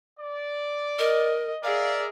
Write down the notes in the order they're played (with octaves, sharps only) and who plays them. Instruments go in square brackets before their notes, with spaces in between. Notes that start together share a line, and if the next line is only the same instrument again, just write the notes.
[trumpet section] D5
[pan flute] A#4 [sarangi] D#5
[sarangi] G#4 [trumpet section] A#4 D5 E5 [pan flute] F5